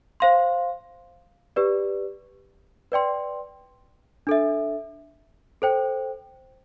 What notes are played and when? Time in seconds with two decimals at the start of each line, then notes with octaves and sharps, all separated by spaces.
0.20 C5 F5 C6
1.56 G4 B4 D5
2.92 B4 D5 G5 C6
4.27 D4 A4 E5
5.62 A4 C5 G5